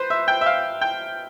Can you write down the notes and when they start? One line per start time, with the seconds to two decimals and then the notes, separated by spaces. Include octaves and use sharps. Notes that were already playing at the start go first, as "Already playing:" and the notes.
Already playing: B4 C5
0.10 E5
0.28 G5
0.41 E5
0.46 F5
0.81 G5